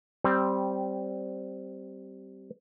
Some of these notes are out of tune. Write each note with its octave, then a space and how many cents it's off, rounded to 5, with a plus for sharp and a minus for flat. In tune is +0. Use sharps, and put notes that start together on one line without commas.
G3 -10 C4 +0